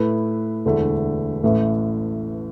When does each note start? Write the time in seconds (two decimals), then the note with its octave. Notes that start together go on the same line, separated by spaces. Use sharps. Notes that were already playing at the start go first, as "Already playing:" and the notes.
Already playing: A2 A3 E4 B4
0.65 E1 D2 D3 A3 E4
1.43 A1 A2 A3